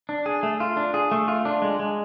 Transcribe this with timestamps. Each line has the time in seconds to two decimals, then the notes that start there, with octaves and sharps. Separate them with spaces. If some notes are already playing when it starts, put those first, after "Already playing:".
0.09 D4
0.26 G#4
0.43 A3
0.60 F4
0.77 D4
0.94 G#4
1.11 A3
1.28 F4
1.45 D4
1.62 G#3
1.80 G#3